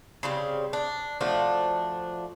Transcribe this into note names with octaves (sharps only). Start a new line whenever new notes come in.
C#3 G3 C4
D4
F3 A3 D4 F#4